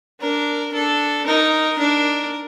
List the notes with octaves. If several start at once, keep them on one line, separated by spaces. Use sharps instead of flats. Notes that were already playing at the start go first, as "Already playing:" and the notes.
D4 A#4
D4 A4
D#4 A#4
D4